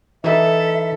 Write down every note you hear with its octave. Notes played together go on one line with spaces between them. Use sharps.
E3 D#4 E4 A4 E5